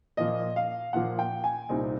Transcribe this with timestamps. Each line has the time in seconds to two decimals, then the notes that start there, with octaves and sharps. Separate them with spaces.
0.17 A#2 F3 A#3 D#5
0.56 F5
0.93 A#2 F3 A#3 F#5
1.19 G5
1.44 G#5
1.69 C2 A#2 G3 C4 D#4